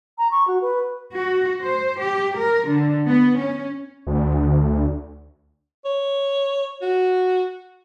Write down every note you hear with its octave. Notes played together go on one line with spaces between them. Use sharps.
A#5
C#6
F#4
B4
F#4
C5
G4
A#4
D3
B3
C#4
D2
C#5
F#4